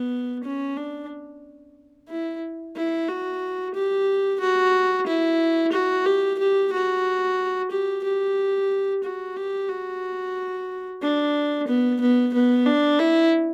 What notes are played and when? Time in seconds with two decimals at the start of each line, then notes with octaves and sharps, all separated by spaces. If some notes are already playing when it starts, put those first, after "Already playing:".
Already playing: B3
0.44 C#4
0.77 D4
2.09 E4
2.76 E4
3.08 F#4
3.75 G4
4.41 F#4
5.07 E4
5.73 F#4
6.06 G4
6.39 G4
6.73 F#4
7.71 G4
8.04 G4
9.03 F#4
9.37 G4
9.69 F#4
11.02 D4
11.68 B3
12.01 B3
12.34 B3
12.66 D4
12.99 E4